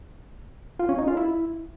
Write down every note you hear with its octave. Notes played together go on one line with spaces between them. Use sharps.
F4
C#4
D#4
F4
E4